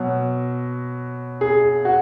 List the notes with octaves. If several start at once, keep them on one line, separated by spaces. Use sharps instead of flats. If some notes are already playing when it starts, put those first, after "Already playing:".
Already playing: B2 F#3
G#4
F#4